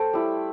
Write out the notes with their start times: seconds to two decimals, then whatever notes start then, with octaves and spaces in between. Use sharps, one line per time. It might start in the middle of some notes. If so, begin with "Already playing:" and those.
Already playing: A3 A4 C5 G5 A5
0.13 G3 E4